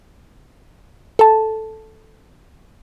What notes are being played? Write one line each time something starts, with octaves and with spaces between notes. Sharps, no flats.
A4 A5